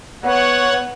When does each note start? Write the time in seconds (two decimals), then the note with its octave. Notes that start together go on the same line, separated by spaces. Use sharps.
0.23 B3 C#5 F#5